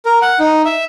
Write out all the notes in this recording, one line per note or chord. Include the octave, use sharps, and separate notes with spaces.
A#4
F#5
D#4
E5